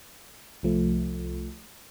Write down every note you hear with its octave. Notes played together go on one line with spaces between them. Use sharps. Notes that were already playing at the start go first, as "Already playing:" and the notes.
C2 F3 A3